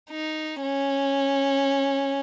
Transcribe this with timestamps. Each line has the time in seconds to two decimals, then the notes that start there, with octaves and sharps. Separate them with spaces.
0.10 D#4
0.62 C#4